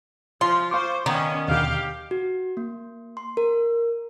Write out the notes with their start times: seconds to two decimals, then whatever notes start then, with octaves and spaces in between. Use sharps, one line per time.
0.41 F3 F4 C6
0.71 C5 F5 C#6 D6
1.06 D#3 B3 C#4 D5
1.48 D#2 B2 D3 G4 F5
2.11 F#4
2.57 A#3
3.17 C6
3.37 A#4